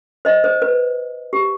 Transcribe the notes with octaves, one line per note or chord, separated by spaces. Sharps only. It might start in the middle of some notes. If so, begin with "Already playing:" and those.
C5 D#5
C5
B4
G4